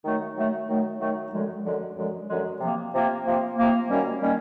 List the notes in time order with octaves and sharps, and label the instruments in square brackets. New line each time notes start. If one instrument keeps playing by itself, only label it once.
[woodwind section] D#3 F#3 A3
D#3 F#3 A3
D#3 F#3 A3
D#3 F#3 A3
F#2 D3 F3 G#3
F#2 D3 F3 G#3
F#2 D3 F3 G#3
F#2 D3 F3 G#3
C3 F3 A#3
C3 F3 A#3
C3 F3 A#3
C3 F3 A#3
F#2 D#3 G3 A#3 C#4
D#3 G3 A#3 C#4